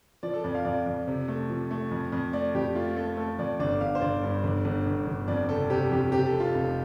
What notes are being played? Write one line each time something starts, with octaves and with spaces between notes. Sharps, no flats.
F3 D5
A4
F2 D5
F5
F2 D5
F2
C3
A3
F3
A3
F2
F2
A3 D5
F2 G4
A3 F4
A3 A4
A3 A4
F2 D5
G1 D5
G1 F5
C5
G1 D5
G2
G1
G1
G1
G1
F2 D5
C3 A4
C3 G4
F2 G4
C3 G4
A4
F1
F4
F1